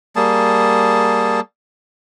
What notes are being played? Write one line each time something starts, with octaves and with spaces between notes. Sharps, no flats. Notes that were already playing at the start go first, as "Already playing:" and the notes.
G3 A#3 G#4 A5